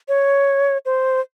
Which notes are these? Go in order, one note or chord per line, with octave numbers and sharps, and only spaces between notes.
C#5
C5